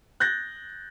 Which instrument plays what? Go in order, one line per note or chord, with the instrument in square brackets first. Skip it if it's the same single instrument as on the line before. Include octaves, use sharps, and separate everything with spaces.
[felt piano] F#6 G6 A6 A#6